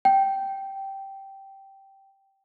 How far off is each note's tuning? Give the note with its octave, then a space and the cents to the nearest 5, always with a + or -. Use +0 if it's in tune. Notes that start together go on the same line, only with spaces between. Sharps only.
G5 -10